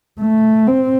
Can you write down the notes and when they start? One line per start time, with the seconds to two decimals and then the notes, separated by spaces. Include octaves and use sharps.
0.21 A3
0.67 C4